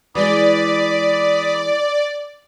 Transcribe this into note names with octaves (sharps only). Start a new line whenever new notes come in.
E3 G#3 D5 B5 D6 D#6